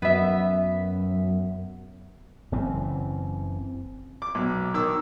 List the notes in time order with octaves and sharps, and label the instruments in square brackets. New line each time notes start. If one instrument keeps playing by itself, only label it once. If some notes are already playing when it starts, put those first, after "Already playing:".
[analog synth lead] F#2 [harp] B3 E5
[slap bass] F#1 C#3 E3 C4
[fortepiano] D6
B1
D#3 D6 E6